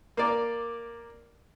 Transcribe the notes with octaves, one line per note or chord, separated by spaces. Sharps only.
A#3 D5